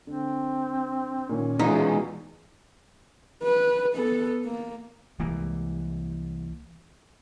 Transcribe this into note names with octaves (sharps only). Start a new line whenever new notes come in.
D3 C4
A#2 D#3 C#4
B2 E3 G#3 D#4 F4
B4
B3 A4
A#3
C2 E3 G#3 A#3